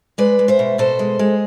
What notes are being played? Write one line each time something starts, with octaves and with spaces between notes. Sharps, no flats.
G#3 B4 D5
G#3
C5 E5
B2
B2 A4 C5
G#3
G#3